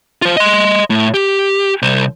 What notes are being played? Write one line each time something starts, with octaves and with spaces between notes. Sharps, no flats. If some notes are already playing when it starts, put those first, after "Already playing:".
F4 C5
D#5 C6
A2
G4
C2 C5